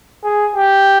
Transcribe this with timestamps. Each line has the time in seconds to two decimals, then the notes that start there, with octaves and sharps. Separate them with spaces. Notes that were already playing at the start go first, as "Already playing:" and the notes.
0.24 G#4
0.56 G4